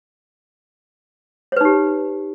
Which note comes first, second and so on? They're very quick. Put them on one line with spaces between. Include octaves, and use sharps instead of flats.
C#5 B4 D#4 G4